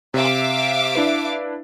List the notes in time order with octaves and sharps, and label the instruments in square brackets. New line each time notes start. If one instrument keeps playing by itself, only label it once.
[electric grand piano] C3 [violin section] E5 F5 D6
[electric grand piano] D4 E4 B4